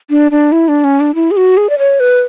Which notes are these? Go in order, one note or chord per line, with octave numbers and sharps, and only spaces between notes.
D4
D4
E4
D4
C#4
D4
E4
G#4
F#4
G#4
D5
C#5
B4